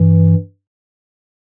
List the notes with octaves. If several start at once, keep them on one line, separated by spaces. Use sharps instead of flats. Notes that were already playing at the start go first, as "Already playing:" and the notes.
Already playing: G2 E3